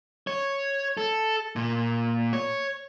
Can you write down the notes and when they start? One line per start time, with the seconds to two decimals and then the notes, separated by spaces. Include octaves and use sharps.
0.27 C#5
0.97 A4
1.56 A#2
2.33 C#5